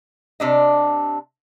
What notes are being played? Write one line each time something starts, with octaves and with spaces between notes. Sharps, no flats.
C3 D4 D#5